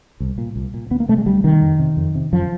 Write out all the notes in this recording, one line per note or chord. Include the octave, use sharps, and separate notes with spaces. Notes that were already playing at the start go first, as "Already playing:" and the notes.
C2
A#2
C2
A#2
D2 B3
A#3
C3 A3
G#3
D2 G3
C3 D#3
F2
C3
F2
C3
F#2 F3